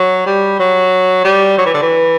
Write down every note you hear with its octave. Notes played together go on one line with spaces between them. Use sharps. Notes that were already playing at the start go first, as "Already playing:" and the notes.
Already playing: F#3
G3
F#3
G3
F#3
E3
D3
E3